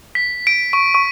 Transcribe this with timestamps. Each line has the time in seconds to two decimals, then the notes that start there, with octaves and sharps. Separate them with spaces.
0.15 B6
0.47 D7
0.73 C#6
0.95 C#6